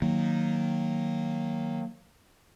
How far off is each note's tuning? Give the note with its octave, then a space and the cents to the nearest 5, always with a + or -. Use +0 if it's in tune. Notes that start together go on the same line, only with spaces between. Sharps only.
D#3 +0 F#3 -5 A#3 +0